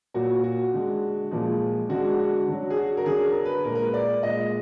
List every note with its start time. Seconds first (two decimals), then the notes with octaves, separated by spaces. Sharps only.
0.14 A#2 F#3 F#4
0.44 F#4
0.73 D3 G#3
1.31 A#2 F3 G#3
1.89 D3 G#3 F#4
2.19 F#4
2.48 D3 F#3
2.70 G#4
2.77 F#4
2.97 A#4
3.06 D3 F#3 G#4
3.26 A#4
3.45 B4
3.64 A#2 A#4
3.68 G#3
3.75 A#4
3.85 B4
3.94 D5
4.23 A#2 G#3 D#5